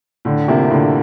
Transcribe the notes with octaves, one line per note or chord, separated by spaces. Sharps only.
A2 D3
C3 F3 A#3 E4
A2 D3